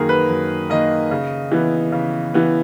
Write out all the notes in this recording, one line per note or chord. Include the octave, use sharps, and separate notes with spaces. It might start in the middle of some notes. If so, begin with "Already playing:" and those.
Already playing: F#2 D#3 A#3 G#4 A#4
B4
F#2
D#3 A#3 D#5
C#3
E3 B3
C#3
E3 B3